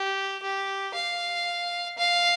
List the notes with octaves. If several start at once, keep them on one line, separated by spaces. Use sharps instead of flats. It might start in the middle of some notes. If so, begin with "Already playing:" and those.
Already playing: G4
G4
F5
F5